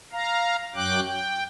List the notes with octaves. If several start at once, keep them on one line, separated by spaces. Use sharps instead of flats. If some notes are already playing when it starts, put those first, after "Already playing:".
F5 A#5
F#2 F#3 G5 D6 F#6
G5